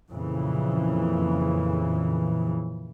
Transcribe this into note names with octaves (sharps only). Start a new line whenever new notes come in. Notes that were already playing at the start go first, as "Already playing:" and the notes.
F2 A#2 C#3 E3